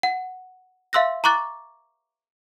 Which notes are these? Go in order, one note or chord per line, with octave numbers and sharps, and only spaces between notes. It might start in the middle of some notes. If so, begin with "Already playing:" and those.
F#5
E5 F5 C6 E6 F#6 A#6
A#5 C#6 D6 F#6 A6